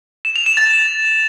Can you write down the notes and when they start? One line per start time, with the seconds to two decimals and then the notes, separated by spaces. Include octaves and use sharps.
0.25 E7
0.36 F7
0.46 E7
0.57 A6